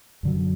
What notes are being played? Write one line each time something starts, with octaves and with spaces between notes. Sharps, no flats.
F#2 D3 F#3